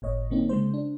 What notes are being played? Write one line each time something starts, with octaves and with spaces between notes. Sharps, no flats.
G1 A2 C#5 D#5
D3 A#3 C4 D#4
C#3 G#3 C5
D4